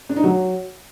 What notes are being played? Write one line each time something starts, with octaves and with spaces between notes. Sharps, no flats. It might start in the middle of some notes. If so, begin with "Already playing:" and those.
D4
D#4
F#3